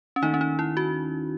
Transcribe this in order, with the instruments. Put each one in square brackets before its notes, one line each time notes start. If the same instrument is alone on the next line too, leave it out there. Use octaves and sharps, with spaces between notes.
[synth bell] C#4
[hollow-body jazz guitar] D#2 D#3 A3 [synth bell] D#4
[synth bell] C#4
D#4
E4
F#4